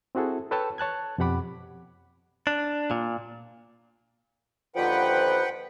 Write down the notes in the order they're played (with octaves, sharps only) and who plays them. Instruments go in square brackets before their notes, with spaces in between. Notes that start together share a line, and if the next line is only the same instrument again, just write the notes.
[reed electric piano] C4 E4 F#4 G#4 A4
A4 B4 C#5 G5 A5 E6
C#5 A5 F#6 G#6
F2 B2 G4 F#5 B5 D6
[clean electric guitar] D4
A#2
[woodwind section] D#2 D3 F3 [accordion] B4 F#5 G5